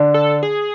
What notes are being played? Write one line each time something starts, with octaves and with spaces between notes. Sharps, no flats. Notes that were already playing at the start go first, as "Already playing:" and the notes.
Already playing: D3 D4
A4
G#4